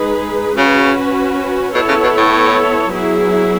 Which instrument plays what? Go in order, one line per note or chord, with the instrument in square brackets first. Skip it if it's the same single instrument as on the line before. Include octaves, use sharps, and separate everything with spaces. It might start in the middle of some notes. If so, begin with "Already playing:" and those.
Already playing: [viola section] G#3 D#4 G#4 B4
[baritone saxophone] C#3 [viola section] C#4 F#4 B4
[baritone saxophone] B2 [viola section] B3 E4 A4 C#5
[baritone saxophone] C#3
B2
A2
[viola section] F#3 B3 E4 G#4